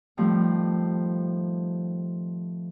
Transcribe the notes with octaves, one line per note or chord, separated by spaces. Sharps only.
A2 D#3 F3 G3 A3 C4